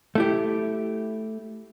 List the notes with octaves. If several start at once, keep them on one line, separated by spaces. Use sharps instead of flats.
A3 E4 G4